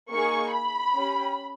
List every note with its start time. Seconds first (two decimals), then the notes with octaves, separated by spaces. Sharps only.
0.11 A#3 D#4 G#4 C#6
0.52 B5
0.93 C#4 G4